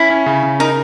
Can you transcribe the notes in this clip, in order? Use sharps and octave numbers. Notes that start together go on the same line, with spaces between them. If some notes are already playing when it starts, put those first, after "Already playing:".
Already playing: C#4 E4
C#4
C#3
C#3
D#4 A#4